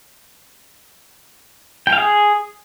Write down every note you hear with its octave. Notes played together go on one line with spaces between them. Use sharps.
G5
F5
G#4